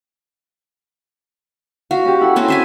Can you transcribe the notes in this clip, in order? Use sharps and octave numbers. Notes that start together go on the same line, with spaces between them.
F#4 F5
C#4 G4
E4 A4 F#5
C4 C#4 F#4
C5 E5 G#5